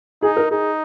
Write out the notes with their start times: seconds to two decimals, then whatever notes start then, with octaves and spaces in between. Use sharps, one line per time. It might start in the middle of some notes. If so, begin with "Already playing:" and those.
0.22 D#4 G#4
0.37 A#4
0.51 D#4 G#4